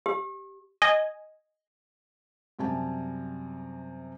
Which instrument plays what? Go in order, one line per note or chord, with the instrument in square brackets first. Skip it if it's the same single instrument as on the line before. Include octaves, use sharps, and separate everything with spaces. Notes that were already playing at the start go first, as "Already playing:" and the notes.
[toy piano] G4
[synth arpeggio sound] D#5 G#5
[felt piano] F#2 C3 G3 G#5 A5